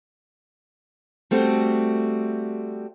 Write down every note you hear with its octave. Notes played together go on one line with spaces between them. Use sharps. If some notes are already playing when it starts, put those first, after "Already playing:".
G3 A3 C4 F#4